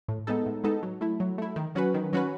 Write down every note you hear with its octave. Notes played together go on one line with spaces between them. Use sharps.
A2
G#3 B3 D#4 A4
A2
G#3 B3 D#4 A4
F#3
A3 E4
F#3
A3 E4
D#3
F#3 C#4 F#4 B4
D#3
F#3 C#4 F#4 B4